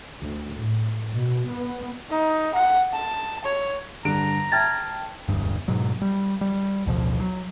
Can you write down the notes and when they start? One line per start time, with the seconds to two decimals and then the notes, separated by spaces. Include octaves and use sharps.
0.20 D2
0.56 A2
1.13 B2
1.50 B3
2.10 D#4
2.54 F#5
2.93 A5
3.44 C#5
4.05 G2 D3 A#5 D7
4.52 E5 G5 A5 F6 G#6 A6
5.28 E1 D2 G2
5.68 G#2 B2 F#3
6.02 G3
6.41 G3
6.86 A1 D2 B2 F3
7.20 F#3